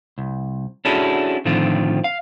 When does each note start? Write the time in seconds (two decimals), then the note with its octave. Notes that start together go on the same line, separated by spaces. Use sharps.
0.18 C2
0.85 C#4 D4 E4 F#4 G#4 A4
1.45 A2 D3 D#3 F3 C4 F4
2.04 F5